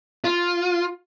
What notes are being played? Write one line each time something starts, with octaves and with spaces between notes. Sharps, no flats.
F4